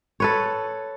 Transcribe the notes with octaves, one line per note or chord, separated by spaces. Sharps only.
A4 B4 C#5